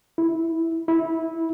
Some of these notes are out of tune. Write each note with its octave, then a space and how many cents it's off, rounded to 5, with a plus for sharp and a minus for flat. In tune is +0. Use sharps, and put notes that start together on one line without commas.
E4 -10
E4 -15